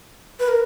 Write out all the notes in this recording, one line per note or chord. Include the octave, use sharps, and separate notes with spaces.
B4
A#4